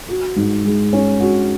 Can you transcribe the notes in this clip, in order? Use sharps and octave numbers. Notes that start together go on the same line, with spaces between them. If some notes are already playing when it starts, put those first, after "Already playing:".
F#4
G#2
G#3
C#4
F#4